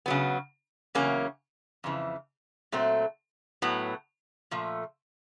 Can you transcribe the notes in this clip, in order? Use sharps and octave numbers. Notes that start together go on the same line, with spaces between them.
C#3 F#3 B3
E2 C#3 F#3 A#3 C#4
F2 C#3 E3
A#2 F#3 A3 C4
A2 F#3 B3
A#2 F3 A3